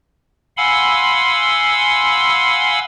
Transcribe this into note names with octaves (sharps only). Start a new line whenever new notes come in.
F5 F#5 G#5 B5 C6 E6